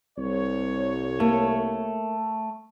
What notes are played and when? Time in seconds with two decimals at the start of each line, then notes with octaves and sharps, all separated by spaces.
0.17 C2 C#5
1.20 A3 A#3